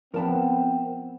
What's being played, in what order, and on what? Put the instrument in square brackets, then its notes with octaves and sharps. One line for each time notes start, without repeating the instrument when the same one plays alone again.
[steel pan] F3 B3 [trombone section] C4 [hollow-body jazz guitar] A#4 A5 B5